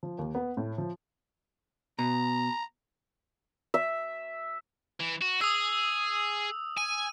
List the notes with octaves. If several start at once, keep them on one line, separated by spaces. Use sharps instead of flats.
F3
D#2
B3
A2
F3
B2 A#5
E5
E3
F#4
G#4 D#6 E6
G#5 D#7